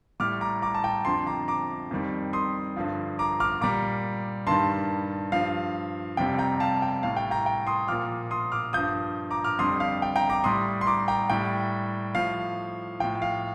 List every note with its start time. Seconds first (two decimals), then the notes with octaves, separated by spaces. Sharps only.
0.20 A2 G3 D6 F6
0.41 A#5 D6
0.62 A#5 D6
0.75 A5
0.84 G5 A#5
1.05 F2 D3 F3 A5 C6
1.26 A#5 D6
1.48 A#5 D6
1.91 F2 D#3 G3
2.33 C6 D#6
2.76 G2 D3 F3
3.19 A#5 D6
3.40 D6 F6
3.61 A#2 G3 A#5 D6
4.47 G2 D#3 G3 A5 C6
5.32 G2 F3 F5
6.17 F2 C3 G3 G5
6.38 G5 A#5
6.60 F5 A5
6.82 G5
7.03 A2 G3 F5
7.17 G5
7.31 G5 A#5
7.46 G5
7.67 C6 D#6
7.88 A#2 F3 D6 F6
8.31 C6 D#6
8.52 D6 F6
8.73 G2 F3 D#6 G6
9.31 A#5 D6
9.44 D6 F6
9.58 F2 D3 G3 C6 D#6
9.80 F5
10.02 G5
10.16 G5 A#5
10.30 A#5 D6
10.44 A2 G3 C6 D#6
10.81 C6
10.87 A#5 D6
11.08 G5 A#5
11.30 A2 G3 G5
12.15 A2 F3 F5
13.00 A2 F3 G5
13.22 F5